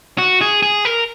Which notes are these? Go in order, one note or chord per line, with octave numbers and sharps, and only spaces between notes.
F#4
G#4
G#4
A#4